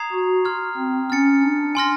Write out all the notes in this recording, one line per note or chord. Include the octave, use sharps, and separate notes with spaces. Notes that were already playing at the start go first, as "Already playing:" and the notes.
Already playing: A#5 D#6 G#6 C7 F7
F#4
C6 F6 G#6
C4
C#4 F6 A6 C#7
D4
G#5 C6 F6 A#6